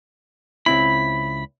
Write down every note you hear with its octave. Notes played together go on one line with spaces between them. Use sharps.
C#2 C4 E4 B5